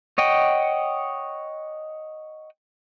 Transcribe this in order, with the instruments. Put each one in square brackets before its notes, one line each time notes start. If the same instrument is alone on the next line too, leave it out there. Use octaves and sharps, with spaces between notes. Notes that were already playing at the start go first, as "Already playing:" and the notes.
[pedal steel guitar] C#5 D#5 F#5 G5